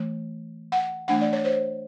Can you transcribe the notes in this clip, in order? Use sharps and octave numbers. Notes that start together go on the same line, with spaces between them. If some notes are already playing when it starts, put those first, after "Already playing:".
Already playing: E3 A3
F#5
E3 A3 D4 F#5
D5
C#5
C5